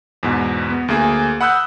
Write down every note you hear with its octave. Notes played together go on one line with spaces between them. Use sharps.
E2 G#2 B2
B3
D2 A#3 G#4
F#5 B5 D#6 E6 F#6 G6